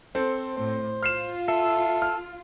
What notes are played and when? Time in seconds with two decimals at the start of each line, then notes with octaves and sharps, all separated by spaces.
0.15 C4 A4 C5
0.57 A2 C5
1.03 F4 F6 C7 E7
1.48 A4 E5
2.02 F6